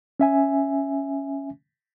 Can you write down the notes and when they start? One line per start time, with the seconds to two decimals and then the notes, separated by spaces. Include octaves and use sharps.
0.20 C#4 E5 G#5